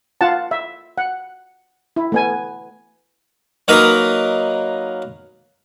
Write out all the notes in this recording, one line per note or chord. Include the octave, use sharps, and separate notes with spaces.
F4 F#5 A5
E5
F#5
E4
A3 B3 G#5
F#3 A#3 D#4 A#4 B4 D#5